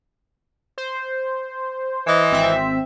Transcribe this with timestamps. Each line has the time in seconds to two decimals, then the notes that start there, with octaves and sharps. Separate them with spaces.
0.78 C5
2.07 E3 D#5
2.31 G#1 C4 E5